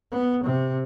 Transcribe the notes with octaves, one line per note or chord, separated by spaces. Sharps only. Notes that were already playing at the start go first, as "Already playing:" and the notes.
B3
C3